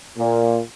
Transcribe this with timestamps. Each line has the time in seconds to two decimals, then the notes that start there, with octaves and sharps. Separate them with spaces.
0.18 A#2